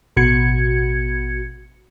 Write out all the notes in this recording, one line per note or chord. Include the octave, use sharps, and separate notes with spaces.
A1 B2 F#4 G#6 C#7